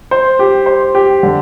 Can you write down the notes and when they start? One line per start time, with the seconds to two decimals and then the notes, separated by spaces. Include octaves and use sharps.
0.11 C5
0.39 G4
0.66 C5
0.95 G4
1.23 D3